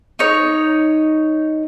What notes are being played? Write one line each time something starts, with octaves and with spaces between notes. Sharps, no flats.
D#4 C#5